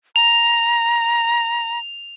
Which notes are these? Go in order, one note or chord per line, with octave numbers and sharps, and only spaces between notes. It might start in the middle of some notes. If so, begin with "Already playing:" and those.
A#5 F7